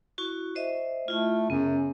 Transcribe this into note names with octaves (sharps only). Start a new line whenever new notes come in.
E4 F#4 C#6
C5 D#5 E5
A3 E4 F4
F#2 C#3 B3